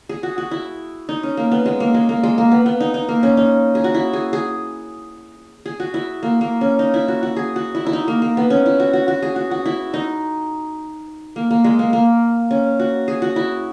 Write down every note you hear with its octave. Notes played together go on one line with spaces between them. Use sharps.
G#4
F#4
F#4
E4
D#4
C#4
A#3
B3
G#3
A#3
G#3
A#3
G#3
A#3
B3
B3
D#4
D#4
A#3
C#4
D#4
G#4
F#4
E4
G#4
G#4
G#4
F#4
E4
A#3
A#3
C#4
D#4
E4
F#4
F#4
G#4
F#4
E4
E4
D#4
A#3
A#3
B3
C#4
E4
F#4
F#4
F#4
G#4
F#4
F#4
E4
D#4
A#3
A#3
G#3
A#3
A#3
C#4
F#4
G#4
F#4
E4